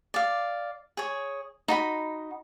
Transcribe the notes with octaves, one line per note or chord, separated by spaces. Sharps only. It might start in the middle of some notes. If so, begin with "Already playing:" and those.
D5 F5
G#4 C#5
D#4 F#4 B5